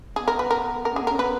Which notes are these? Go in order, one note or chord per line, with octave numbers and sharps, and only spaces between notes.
B3 G#4
A#4
B4
A#4
A#4
C#4 G#4
B3
C#4 A#4
B3 B4